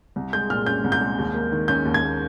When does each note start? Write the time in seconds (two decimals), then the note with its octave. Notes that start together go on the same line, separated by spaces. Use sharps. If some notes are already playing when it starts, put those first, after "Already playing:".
0.16 C2
0.33 G#3 G6
0.50 A#2 F6
0.66 C#4 G6
0.84 C2
0.92 G6
1.01 G#3
1.18 D#2
1.34 A#3
1.52 D#3
1.68 C#4 G6
1.85 D#2
1.94 G#6
2.03 A#3